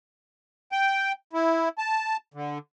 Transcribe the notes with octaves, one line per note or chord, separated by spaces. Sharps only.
G5
E4
A5
D3